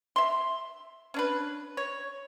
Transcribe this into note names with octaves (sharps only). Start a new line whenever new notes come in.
E5 C6
C#4 D4 B4
C#5